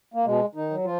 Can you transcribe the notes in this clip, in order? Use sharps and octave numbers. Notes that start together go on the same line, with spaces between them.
A#3
B2 G#3
D#3 D#4
F#3
F3 F4